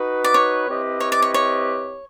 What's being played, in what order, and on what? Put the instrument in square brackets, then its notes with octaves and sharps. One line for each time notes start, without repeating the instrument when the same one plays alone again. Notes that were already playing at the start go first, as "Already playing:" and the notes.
Already playing: [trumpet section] D#4 F#4 B4
[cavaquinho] D5
C#5
[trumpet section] C4 E4 G4 B4 D#5
[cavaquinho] C#5
D5
C#5
C#5